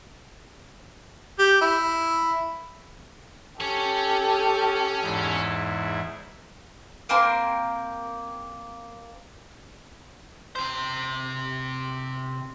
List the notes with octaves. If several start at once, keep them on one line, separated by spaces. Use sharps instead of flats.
G4
E4
C#4 G4 A4 C#5
E2 G#2 E4
A#3 C4 A#4 C6
C3 C5